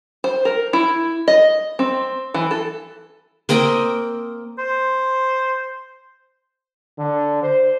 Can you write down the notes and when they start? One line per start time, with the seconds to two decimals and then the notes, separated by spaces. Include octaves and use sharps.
0.24 C5
0.45 A#4
0.73 E4
1.28 D#5
1.79 C4
2.34 E3
2.51 A4
3.49 A#3 C4 D#5 G5
4.58 C5
6.99 D3
7.43 C5